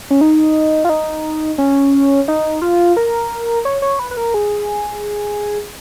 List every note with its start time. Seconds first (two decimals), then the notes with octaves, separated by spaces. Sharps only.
0.10 C#4
0.21 D#4
0.85 F4
0.89 D#4
1.58 C#4
2.28 D#4
2.62 F4
2.97 A#4
3.65 C#5
3.82 C#5
3.99 B4
4.11 B4
4.17 A#4
4.34 G#4